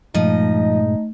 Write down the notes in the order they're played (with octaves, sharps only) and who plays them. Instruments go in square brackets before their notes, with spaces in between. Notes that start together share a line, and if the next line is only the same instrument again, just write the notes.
[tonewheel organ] G2 A#2 G#3 [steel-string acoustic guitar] F3 D#5 [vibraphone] A3 [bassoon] D#4